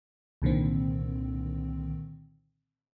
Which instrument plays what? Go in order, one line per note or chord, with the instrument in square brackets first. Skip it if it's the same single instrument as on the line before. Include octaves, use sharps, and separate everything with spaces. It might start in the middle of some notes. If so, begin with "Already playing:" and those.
[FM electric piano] C2 A#2 D3 D#3 C4